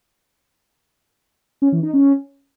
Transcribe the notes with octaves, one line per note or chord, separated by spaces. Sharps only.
C#4
E3
D#4
C#4